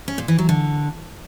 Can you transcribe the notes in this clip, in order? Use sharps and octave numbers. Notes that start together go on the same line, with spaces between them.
C#4
A#2
E3
F#3
D3